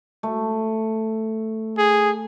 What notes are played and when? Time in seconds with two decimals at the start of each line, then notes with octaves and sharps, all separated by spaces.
0.23 A3
1.78 G#4